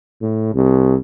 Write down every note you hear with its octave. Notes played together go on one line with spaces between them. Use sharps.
A2
C2